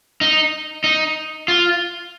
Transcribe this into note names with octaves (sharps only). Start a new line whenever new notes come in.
D#4
D#4
F4